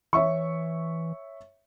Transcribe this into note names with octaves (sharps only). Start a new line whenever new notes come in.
E3 C#5 E5 C#6